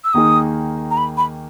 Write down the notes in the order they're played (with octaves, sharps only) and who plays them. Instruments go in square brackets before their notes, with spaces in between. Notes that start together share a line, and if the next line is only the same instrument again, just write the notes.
[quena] E6
[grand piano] D#2 D#3 A#3 D#4 G#4 [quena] D#6
[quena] A#5
B5
B5